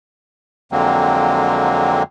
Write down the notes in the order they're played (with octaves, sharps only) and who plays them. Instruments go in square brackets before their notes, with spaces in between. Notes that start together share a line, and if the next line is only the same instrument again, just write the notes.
[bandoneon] F2 D3 F#3 G#3 A#3 C4